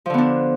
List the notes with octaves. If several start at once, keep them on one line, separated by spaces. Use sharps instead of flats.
D3 F3 B3 D4